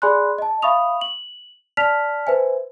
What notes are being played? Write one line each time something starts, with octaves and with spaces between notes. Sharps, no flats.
G#4 D5 G#5 B5 C6 F#6
D#5 A5
E5 F5 B5 C#6 D#6 F7
F#7
D5 A5 F6 B6 F7
B4 C5 E5 G#5